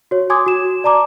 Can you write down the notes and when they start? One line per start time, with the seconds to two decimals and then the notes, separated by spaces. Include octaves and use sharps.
0.11 F#4 C#5
0.30 G#5 C6 D6 D#6 G#6
0.46 F#4 E7
0.84 D5 A5 A#5 D6